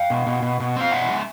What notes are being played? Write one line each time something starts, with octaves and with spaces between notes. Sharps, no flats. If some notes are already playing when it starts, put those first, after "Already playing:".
Already playing: F5 G5
B2
B2
B2
B2
C4 F5
B2 E5 F#5
G#3